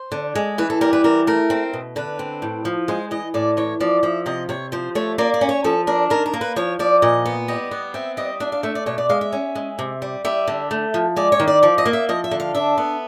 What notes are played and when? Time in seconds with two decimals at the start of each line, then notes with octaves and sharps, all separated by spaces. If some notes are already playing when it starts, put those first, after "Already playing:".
Already playing: C5
0.12 D3
0.35 G#3
0.58 E3 B4
0.70 A4
0.81 G3 A#4
0.93 B4
1.04 E3 A#4
1.27 A3 A#4
1.50 C4
1.73 B2
1.96 D3 B4
2.19 C4
2.42 A2
2.65 F3
2.88 G#3 C5
3.11 E3 D#5
3.34 A2 D5
3.57 E3 C#5
3.80 F3 D5
4.03 F3 E5
4.26 C3 D#5
4.49 C3 C#5
4.72 F3 C5
4.95 A3 C#5
5.18 A#3 D5
5.34 D5
5.41 C#4
5.49 C#5
5.64 F3 A4
5.87 D4 A#4
6.10 D#3 A#4
6.26 A#4
6.34 A#3
6.41 B4
6.56 F3 C#5
6.79 F3 D5
7.02 A#2 D#5
7.26 B3
7.48 G3 D#5
7.71 B3
7.94 C4 E5
8.17 G3 D#5
8.40 D4 E5
8.52 F5
8.63 A3 E5
8.75 D5
8.86 B2 C#5
8.98 D5
9.10 G#3 F5
9.21 E5
9.33 C#4
9.55 G#3
9.79 C3
10.02 G3
10.25 G3 E5
10.47 D3
10.71 A3
10.94 F3
11.16 G#3 D5
11.32 C#5
11.40 D#3
11.47 D5
11.63 F3 D5
11.78 D#5
11.86 A#3
11.93 E5
12.09 F3 D#5
12.24 E5
12.31 D3
12.40 F5
12.55 D4 E5
12.78 B3